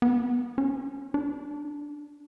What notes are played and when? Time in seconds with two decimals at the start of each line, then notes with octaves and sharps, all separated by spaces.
0.02 B3
0.58 C#4
1.14 D4